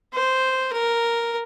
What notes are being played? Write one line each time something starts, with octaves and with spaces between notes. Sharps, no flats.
C5
A#4